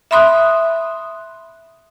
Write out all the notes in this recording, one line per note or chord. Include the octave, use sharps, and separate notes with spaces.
E5 B5 C6 D#6 F#6